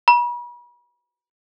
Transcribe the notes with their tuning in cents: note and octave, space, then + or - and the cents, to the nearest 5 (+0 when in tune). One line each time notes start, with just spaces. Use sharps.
B5 -40